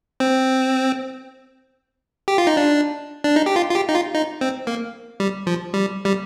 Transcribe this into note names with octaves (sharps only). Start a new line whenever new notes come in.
C4
G4
F4
D#4
D4
D4
D#4
G4
F4
F4
G4
D#4
F4
D#4
C4
A#3
G3
F3
G3
G3